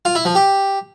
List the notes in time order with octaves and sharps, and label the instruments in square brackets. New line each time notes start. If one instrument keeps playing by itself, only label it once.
[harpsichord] F4
E4
F3
G4